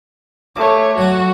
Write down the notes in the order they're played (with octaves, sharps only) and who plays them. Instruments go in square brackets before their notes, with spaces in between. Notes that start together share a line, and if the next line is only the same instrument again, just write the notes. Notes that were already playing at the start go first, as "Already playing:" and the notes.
[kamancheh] A3 C#5 [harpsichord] D6
[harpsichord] F#3 F#5 [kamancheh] F#4